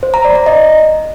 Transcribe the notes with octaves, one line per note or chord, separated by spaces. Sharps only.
C5
A#5
D5
A#5
D#5